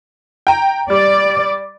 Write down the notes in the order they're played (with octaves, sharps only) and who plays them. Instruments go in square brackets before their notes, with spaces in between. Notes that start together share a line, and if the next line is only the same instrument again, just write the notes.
[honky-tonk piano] G5 A#5
[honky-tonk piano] G3 [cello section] D5